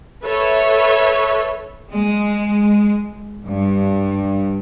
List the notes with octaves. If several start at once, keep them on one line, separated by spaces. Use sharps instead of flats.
A4 B4 C#5 E5
G#3
G2